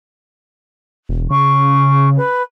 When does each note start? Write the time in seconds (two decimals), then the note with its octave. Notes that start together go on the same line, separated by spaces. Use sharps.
1.09 E1
1.30 C#3 C#6
2.17 B4